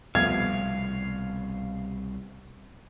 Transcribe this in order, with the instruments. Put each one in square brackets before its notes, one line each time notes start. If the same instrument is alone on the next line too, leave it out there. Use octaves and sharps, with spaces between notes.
[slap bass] C2 B2 [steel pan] F3 A3 B3 [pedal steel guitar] F5 [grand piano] G#6